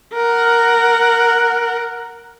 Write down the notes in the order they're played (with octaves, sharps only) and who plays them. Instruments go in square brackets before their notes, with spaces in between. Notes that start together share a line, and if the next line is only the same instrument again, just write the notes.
[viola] A#4 F#5